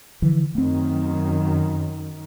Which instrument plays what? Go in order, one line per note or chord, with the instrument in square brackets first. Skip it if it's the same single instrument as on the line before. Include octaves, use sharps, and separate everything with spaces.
[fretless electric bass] D3 E3 F3
[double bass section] F#2 D#3 [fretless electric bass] A3 C4